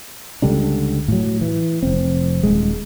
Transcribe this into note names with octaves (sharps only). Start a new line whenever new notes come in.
C#2 D3 G3 D4
A2 F#3
E3
F1 C4
D#1 G#3